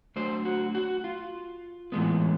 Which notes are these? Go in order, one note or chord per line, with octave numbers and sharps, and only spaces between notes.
F#3 A3 D4 C5
F#4
F#4
F4
A2 E3 G#3 B3